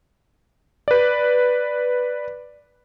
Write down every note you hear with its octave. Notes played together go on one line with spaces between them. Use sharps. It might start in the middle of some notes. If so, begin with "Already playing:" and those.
B4 D5